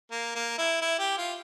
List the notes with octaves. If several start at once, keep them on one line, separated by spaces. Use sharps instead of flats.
A#3
A#3
E4
E4
G4
F4